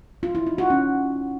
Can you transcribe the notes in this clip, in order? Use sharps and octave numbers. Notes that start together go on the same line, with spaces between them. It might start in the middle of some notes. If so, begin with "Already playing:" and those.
F4
E4
D#4
F#4
C#4